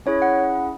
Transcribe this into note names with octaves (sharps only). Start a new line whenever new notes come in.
C#4 E4 G#4 C#5
F#5